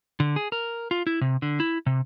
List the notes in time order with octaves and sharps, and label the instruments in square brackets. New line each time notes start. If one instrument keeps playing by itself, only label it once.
[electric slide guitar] D3
G#4
A#4
F4
E4
C3
D3
E4
C3